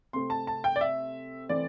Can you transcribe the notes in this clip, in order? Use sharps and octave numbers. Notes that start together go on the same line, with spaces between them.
C3 A3 C4 C6
A5
A5
G5
D5
E5
E3 A3 C4 D5